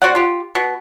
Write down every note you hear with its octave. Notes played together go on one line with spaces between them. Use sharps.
C4 F#4 D5 F#5
F4 G4
B2